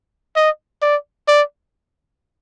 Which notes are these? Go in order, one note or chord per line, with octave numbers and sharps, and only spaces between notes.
D#5
D5
D5